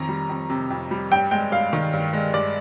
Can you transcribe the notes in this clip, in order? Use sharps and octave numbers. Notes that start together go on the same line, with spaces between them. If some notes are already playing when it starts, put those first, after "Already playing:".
Already playing: F2 D#3 A#5
G3
F2
C3
F2
G3
G2 G5
G#3 G5
G2 F5
D#3
G2
G#3
G2 D5